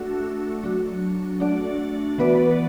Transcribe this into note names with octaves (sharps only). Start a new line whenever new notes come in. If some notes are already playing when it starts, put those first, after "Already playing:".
Already playing: A3 D4 F#4 A4
F#3 D4 F#4
A3 D4 F#4 D5
E3 B3 F#4 B4 D5